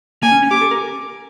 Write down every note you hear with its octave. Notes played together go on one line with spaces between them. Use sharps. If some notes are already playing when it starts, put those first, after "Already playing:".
A#3 G#5
C#4
C#4
G4 D6
A4
A#4